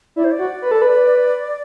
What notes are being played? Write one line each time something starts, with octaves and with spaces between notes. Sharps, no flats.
E4 D5
C5
D5
F#4
B4
A4
B4